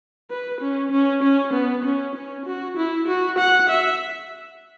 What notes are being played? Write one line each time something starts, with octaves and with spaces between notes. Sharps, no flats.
B4
C#4
C#4
C#4
B3
C#4
C#4
F#4
E4
F#4
F#5
E5